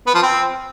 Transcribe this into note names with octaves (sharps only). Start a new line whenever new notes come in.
B3
F3
C4